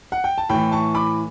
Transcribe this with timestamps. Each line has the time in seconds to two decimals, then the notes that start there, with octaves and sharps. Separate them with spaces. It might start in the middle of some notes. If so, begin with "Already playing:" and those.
0.12 F#5
0.24 G5
0.38 A5
0.49 A2 E3 G5 B5
0.72 A5 C#6
0.95 B5 D6